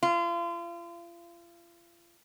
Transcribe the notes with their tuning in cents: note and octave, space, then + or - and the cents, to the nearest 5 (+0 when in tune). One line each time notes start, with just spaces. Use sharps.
F4 -35